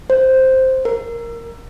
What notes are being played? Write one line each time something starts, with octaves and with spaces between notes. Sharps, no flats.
C5
A#4